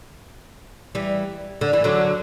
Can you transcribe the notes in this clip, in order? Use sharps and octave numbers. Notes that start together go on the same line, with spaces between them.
E3 G3
D3
E3
D3 F#3